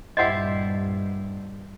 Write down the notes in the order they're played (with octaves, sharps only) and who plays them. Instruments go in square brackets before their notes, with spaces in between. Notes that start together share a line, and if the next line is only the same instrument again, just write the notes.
[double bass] G2 A#2 [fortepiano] E4 G4 C5 [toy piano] D#5 F#5